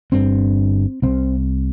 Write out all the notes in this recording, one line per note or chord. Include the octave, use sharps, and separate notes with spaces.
G1 G2 D3 C4
C2 C3 C4